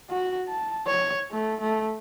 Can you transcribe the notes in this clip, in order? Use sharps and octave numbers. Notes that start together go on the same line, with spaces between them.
F#4
A5
C#5
A3
A3